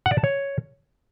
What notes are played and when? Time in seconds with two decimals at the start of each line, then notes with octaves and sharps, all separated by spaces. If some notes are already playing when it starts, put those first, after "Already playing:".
0.06 F#5
0.12 D5
0.18 A5
0.24 C#5